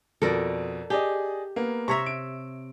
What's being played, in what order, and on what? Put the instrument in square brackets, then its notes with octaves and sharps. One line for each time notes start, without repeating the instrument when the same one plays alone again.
[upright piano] F2 B2 [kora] A4 A#4 D5
[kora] G4 [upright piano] G#4 D5 D#5
[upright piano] A#3 B3
[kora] C3 C#5 E5 [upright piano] A#5 C#6
[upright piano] D7